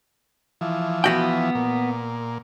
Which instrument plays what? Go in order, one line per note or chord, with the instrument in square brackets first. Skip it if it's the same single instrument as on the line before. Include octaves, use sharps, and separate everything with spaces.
[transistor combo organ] E3 F3
[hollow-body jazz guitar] B3 F#4 G5
[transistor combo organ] A#2